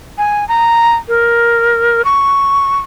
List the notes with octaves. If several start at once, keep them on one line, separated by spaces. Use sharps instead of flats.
G#5
A#5
A#4
C#6